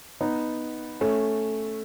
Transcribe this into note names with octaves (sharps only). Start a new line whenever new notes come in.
B3 D#4
A3 C#4